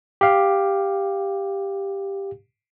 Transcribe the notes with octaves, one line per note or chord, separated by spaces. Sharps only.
G4 F5